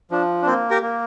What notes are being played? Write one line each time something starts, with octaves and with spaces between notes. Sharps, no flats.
F3 D4
D4
A#3 C4
G4 A#4
A#3